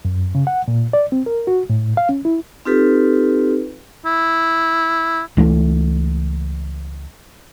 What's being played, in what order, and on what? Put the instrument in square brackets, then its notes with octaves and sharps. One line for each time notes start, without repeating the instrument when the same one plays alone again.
[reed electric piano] F#2
C#3
F#5
A#2
D5
C4
A#4
F#4
A2
F5
C#4
E4
[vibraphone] C4 D#4 F4 G4 A4 B4
[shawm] E4
[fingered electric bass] C#2 E3 F#3 A3